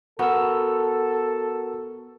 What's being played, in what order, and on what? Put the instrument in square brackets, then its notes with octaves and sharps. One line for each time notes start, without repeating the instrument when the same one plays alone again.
[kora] B3 [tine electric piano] F#4 A#4 E6 [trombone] A4